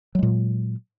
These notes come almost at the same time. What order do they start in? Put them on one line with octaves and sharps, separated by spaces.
F#3 G#3 A#2